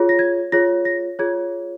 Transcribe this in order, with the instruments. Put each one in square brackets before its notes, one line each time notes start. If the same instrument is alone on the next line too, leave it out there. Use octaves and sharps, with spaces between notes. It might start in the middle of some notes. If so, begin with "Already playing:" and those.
Already playing: [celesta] F4 G#4 C#5
A#6
G#6
F4 G#4 C#5 A#6
A#6
F4 G#4 C#5 G#6